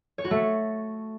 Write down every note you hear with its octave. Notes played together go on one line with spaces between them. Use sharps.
C#5
F#4
A3